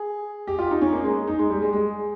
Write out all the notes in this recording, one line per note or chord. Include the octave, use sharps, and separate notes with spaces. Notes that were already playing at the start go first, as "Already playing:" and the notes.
Already playing: G#4
G4
F4
D#4
C#4
A#3
G#3
D#4
G#3
G3
G#3
G#3